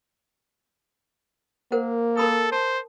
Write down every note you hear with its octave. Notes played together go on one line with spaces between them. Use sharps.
A#3 A#4 C5 F#5
A4 A#4 B5 D#6
C5 A5